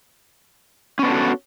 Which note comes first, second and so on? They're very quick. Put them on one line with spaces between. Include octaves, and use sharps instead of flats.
C#4 B3 D4 A4 F#4